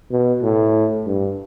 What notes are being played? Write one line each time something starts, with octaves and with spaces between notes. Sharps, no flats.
B2
A2
G2